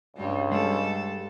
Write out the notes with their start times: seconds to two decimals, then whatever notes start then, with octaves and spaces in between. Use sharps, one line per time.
0.16 C#2 G2 G3
0.52 G3 G#3 A4